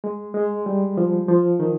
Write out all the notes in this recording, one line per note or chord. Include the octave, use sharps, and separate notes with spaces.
G#3
G#3
G3
F3
F3
D#3